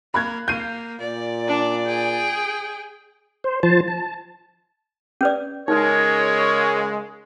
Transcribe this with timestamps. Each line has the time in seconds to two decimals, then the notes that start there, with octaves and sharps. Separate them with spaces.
0.14 A#3 B5 F#6 G#6
0.48 A#3 G6 C7 D#7
1.01 A#2 D5
1.48 D4
1.86 G#4 G5
3.44 C5
3.63 F3 C5 A5
3.88 A5
5.21 C#4 B4 D5
5.68 C#3 G#3 D#4 A#4 C#5